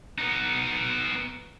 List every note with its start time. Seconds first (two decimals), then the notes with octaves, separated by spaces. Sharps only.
0.19 B3 D#4